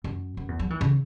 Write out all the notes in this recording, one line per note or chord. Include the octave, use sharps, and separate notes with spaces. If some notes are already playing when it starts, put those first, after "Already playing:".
F#2
F#2
E2
F#3
E3
C#3